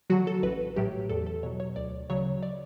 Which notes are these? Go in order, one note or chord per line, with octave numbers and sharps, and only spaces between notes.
D3 F#3 F#4
A4
A1 B4
A2 F#3 G4
E2 A4
A4
B2 F#3 C#5
C#5
D2 D5
C#3 F#3 C#5
D5